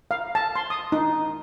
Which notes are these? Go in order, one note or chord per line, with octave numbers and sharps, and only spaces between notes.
F5
A5
C6
D#6
D#4